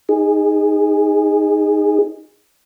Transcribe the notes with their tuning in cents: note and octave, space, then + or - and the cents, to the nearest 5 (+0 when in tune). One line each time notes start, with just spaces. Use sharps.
D#4 +0 G#4 -15